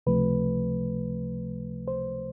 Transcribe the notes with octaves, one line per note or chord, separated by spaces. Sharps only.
C#2 C3 F3 A3 B4
C5